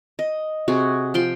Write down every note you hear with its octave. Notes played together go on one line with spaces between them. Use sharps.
D#5
C3 F#4 G#4
F3 G5 C6